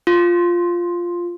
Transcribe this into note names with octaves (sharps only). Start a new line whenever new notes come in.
F4